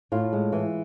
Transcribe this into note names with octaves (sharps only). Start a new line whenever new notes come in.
A2 F4
G#3
E3